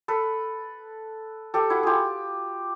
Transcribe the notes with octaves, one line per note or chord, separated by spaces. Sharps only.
A4 B4
G4 A4
E4 F#4
F4 G4 G#4